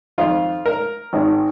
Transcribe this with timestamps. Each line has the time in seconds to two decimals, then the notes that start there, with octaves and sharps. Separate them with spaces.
0.18 F2 D#3 F4
0.66 A#4
1.13 G#1 G#2 D#3